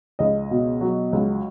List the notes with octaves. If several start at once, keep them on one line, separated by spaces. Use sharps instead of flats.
C#2 D#5
B2
F#3
C#2